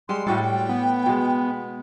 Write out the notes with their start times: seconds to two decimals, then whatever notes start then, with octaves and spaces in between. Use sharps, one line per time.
0.09 G3 G#3 C6
0.27 A2 G3 F#4 A4 G5
0.69 B3
1.06 B2 G#3